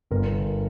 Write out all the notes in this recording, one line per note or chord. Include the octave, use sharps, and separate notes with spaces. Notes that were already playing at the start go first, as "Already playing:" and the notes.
G1 A#4